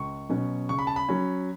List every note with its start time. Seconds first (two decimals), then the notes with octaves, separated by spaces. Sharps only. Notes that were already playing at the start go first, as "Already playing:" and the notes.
Already playing: C#2 C#6
0.30 B2 F#3 C#4
0.69 C#3 C#6
0.79 B5
0.87 A5
0.96 B5
1.09 F#3 C#4